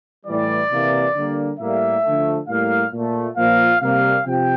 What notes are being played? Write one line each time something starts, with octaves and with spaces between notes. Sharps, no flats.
A2 E3 G3 D5
C3 E3 A#3
D3 G3 A#3
A2 G3 A#3 E5
D3 F3 A3
A2 G3 A#3 F5
A#2 A3
A#2 F3 A#3 F5
C3 G3 A#3 F5
C3 F3 G5